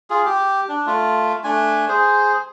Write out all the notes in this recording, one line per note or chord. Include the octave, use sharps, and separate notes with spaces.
F4 G#4
G4
D4
A3 F4
A3 D4 G#5
G#4 C5